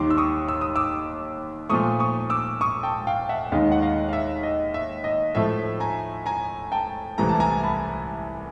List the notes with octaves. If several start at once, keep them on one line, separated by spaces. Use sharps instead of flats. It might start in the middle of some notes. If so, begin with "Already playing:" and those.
Already playing: D#2 D#3 G3 C6 D6
E6
C#6 D#6
E6
D#6
D6 E6
A#2 F3 A3 C#6 D#6
C#6 D#6
D6 E6
C#6 D#6
G5 A5
F5 G5
E5 F#5
D#2 D#3 G#3 D#5 F5
F#5
D#5 F5
F5
E5
D#5
E5
D#5
A2 F3 A3 E5
G#5 A#5
G#5 A#5
G5 A5
C2 C3 E3 A3 A#5
A5
G#5 A#5
A5 B5